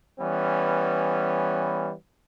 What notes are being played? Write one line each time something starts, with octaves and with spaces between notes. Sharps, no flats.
E3 G3 B3 C#4